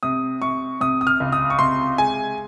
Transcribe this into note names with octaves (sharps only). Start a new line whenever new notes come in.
C3 D#6
C3 C#6
C3 D#6
D#6
F6
C#2
D#6
C#6
C3 C6
G#3 G#5